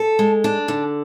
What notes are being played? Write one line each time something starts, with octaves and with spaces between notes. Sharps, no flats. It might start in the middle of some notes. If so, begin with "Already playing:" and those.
Already playing: A4
G#3
D4
D3